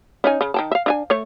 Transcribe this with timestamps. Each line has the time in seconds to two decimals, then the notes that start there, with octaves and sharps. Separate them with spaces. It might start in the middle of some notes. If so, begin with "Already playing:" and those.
0.24 C#4 D#4 G#5
0.41 C#3
0.54 D#3 G5 A5
0.71 E5 F5
0.86 D4 E5 G#5
1.10 A3 C#5